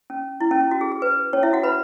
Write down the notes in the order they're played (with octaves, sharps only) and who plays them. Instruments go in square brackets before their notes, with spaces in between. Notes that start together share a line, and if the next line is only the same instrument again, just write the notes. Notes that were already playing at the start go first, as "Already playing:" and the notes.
[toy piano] C#4
E4
C#4
E4
F#4
G#4
G#4
B4
C#4 C#5
E4 E5
F#4 F#5
B4 B5